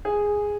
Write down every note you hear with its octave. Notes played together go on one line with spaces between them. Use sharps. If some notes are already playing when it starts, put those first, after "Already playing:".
G#4